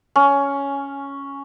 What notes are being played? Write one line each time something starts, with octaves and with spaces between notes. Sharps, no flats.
C#4